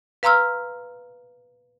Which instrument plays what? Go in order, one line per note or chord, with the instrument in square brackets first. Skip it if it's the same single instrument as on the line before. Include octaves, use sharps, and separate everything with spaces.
[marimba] B4 F5 A#5 C6 E6 F6